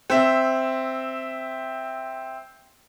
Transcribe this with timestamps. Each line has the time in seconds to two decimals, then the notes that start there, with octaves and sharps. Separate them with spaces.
0.10 C4 E5